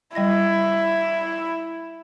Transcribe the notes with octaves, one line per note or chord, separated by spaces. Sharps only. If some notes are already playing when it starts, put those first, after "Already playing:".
G3 E4 D#5 A#6